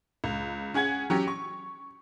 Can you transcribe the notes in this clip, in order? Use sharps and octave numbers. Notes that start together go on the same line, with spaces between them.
C#2
C#4 G#4 F#5 G#6
F#3 C#4 G4
C#6